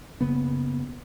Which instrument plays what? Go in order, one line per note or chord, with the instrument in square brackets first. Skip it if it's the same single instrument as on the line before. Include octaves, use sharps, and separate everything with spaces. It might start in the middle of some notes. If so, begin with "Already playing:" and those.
[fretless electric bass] F#1 C#3 A#3 B3